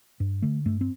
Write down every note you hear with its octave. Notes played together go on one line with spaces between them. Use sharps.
G2
D3 A3
G2 A3
C4